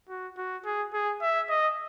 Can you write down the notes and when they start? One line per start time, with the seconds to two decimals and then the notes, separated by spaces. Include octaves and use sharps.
0.09 F#4
0.37 F#4
0.65 G#4
0.94 G#4
1.22 E5
1.49 D#5